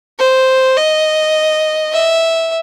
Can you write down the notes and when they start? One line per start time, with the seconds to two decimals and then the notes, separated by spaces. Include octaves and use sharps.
0.19 C5
0.77 D#5
1.92 E5